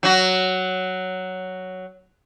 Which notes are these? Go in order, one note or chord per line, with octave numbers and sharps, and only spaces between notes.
F#3 F#4